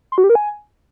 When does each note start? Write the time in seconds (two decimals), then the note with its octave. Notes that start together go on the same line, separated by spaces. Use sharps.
0.12 C6
0.18 F#4
0.24 G4
0.29 A#4
0.35 G#5